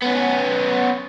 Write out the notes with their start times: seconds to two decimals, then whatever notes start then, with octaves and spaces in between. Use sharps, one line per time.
0.02 B3 C#4